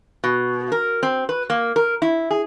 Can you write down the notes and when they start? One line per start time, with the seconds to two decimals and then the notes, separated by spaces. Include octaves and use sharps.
0.24 B2
0.72 A#4
1.03 C4
1.29 B4
1.50 A#3
1.76 A#4
2.02 E4
2.31 G#4